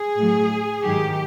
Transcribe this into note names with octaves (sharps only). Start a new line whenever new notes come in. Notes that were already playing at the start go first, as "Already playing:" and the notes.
Already playing: G#4
A2 F#3
G#2 D#3 F#3 G4